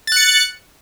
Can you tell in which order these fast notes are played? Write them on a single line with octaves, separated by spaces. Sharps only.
A6 F#6 C#7